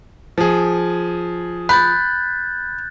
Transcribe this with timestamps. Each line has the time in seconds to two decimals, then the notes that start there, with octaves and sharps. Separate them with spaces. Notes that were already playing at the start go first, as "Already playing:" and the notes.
0.38 F3 G#4
1.69 B5 F#6 G6 A6